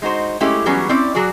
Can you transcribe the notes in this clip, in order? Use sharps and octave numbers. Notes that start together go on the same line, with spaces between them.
G#3 D#4 F#4 C5
G#3 A3 C#4 E4 G4
E3 F#3 G3 B3 C#4 G#4
C4 C#4 E4 D5
F#3 F#4 G#4 D5